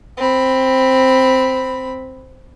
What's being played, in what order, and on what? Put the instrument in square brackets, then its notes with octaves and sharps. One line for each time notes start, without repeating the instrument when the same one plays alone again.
[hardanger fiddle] C4 B5